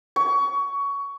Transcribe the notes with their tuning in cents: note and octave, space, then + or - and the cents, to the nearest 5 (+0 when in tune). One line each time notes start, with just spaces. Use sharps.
C#6 +20